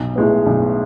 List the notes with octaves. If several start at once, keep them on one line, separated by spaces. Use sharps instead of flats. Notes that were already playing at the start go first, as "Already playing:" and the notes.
Already playing: B1
A2 G#3 B3
B1